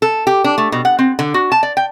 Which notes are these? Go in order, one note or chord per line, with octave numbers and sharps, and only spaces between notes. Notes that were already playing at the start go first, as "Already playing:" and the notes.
A4
G4
D4
A3
B2
F#5
C4
D3
F#4
A5
D5
G5